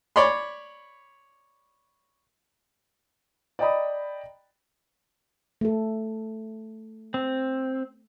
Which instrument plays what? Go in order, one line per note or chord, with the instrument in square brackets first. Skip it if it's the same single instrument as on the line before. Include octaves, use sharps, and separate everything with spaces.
[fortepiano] C#5 D5 B5 C6
[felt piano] D5 D#5 G5 A#5 B5 D#6
[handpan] A3 A4
[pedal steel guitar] C4